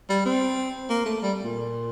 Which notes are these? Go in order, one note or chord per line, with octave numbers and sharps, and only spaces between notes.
G3
C4
A#3
A3
G3
A#2